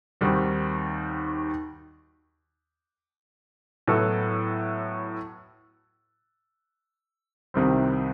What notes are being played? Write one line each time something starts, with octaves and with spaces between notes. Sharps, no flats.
D#2 D#3 G3 C4 F#4
A2 F#3 B3 F#4 A4
C2 C3 D#3 G3 C4